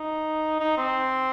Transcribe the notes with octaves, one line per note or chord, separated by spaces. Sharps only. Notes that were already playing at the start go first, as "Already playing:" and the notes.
Already playing: D#4
D#4
C4